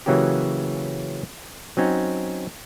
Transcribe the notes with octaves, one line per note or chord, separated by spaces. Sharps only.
C#3 E3 F#3 A#3 C#4 G4
F#3 C4 C#4 D#4